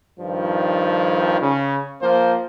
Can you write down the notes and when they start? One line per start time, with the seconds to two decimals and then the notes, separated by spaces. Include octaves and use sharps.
0.20 G2 D#3 F3
1.40 C#3
2.01 F3 A#3 C5